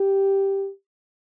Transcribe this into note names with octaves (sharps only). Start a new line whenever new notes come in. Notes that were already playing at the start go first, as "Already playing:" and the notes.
Already playing: G4